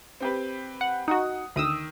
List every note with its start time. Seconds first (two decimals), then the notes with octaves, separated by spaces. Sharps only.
0.20 C4 G4 B4
0.81 F#5
1.08 D#4 F#4 F#5 D#6
1.56 D2 D#3 D#6 E6